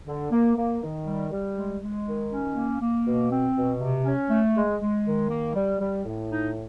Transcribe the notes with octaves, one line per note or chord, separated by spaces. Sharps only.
D3
A#3
A#3
D#3
G3
G3
G#3
G#3
D#3
C#4
A#3
A#3
B2
C4
B2
C3
C#4
A3
G#3
G#3
D#3
A#3
G3
G3
A2
D#4